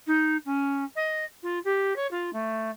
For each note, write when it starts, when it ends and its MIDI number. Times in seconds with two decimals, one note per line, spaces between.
0.07 0.37 63
0.45 0.84 61
0.96 1.25 75
1.43 1.59 65
1.64 1.93 67
1.96 2.07 73
2.11 2.30 65
2.33 2.71 57